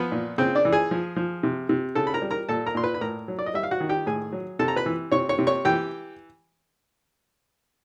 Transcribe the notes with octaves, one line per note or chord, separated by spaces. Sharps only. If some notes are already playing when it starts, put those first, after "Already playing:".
Already playing: F3 B3 B4
A#2
C#3 C4 C5
D4 D5
E3
G#4 G#5
F3
F3
C3
C3
C#3 A4 A5
B5
A#4 A#5
G3
A#4 A#5
A#2 A4 A5
A#4 A#5
A#2 C6
B4 B5
B5
A2 A#4 A#5
F#3
D5
D#5
G3 E5
F5
F#4 F#5
D#3
G4 G5
A2 G#4 G#5
F#3
C3 A4 A5
A#5
B4 B5
E3
C3 C#5 C#6
C#5 C#6
C3
C#5 C#6
E3 G4 G5